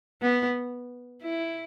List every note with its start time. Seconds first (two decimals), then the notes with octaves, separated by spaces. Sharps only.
0.22 B3
1.23 E4